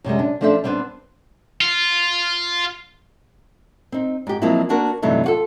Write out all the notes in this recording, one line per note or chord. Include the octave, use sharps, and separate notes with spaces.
F#2 C3 G3 G#3
D4
F3 A3 D4 A4 C5 E5
G3 B3 C4 D4 B4
F4
C4 D#4
G#2 G4
F3 F#3 G#3 A#3 C4 E4
A#3 B3 D4 F#4 A#4
G2 C3 E3 F#3 A3 D#4
F4 F#4 A4